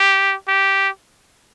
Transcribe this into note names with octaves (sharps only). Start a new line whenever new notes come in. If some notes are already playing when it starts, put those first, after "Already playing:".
Already playing: G4
G4